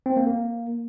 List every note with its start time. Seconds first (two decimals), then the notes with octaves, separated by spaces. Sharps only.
0.06 C4
0.17 A#3
0.27 A#3